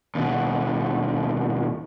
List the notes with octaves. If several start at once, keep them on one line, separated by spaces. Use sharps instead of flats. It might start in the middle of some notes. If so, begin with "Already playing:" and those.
D#2 B2